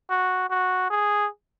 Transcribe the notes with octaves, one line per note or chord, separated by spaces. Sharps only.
F#4
F#4
G#4